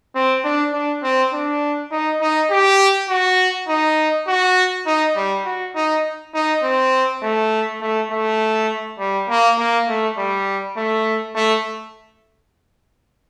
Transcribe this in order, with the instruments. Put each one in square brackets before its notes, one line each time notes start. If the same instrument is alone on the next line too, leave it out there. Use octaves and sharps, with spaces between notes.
[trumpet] C4
D4
D4
C4
D4
D#4
D#4
G4
F#4
D#4
F#4
D#4
G3
F#4
D#4
D#4
C4
A3
A3
A3
G3
A#3
A#3
A3
G3
A3
A3